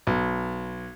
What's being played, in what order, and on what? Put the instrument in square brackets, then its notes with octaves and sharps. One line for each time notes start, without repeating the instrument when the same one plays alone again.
[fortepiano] B1